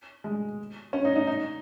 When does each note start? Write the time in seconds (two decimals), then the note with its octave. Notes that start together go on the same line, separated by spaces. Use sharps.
0.24 G#3
0.93 C#4
1.05 D#4
1.16 D#4
1.27 D#4